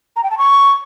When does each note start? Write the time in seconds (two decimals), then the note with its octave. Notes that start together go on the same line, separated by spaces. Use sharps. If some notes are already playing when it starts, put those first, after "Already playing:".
0.16 A#5
0.23 G5
0.31 A5
0.38 C#6